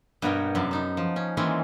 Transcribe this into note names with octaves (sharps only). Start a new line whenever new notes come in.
G2 B2 B3 A#4 C#5 G5
F#2 C3 B3 D5
B3 D#4 A5
F3
C#4
D#3 E3 G#3 A#3 C4 C#4